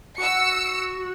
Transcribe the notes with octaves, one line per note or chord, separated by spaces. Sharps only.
F#4 E6 C#7